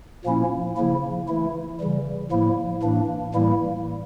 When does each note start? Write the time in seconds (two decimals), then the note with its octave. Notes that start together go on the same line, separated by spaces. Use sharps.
0.25 A#2 F3 A#3 C#4 E4
0.77 C#3 F3 A#3 E4
1.28 E3 A3 E4
1.80 C#3 E3 G3
2.31 A2 F3 A#3 E4
2.83 A2 E3 A#3 D4
3.34 A2 E3 G3 A#3 E4